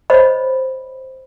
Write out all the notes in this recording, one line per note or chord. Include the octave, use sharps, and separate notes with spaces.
C5 C#5 D#5 B5